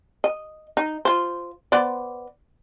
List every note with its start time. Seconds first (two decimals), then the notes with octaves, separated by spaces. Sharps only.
0.24 D#5
0.77 D#4
1.05 F4 C5
1.72 B3 C5 D5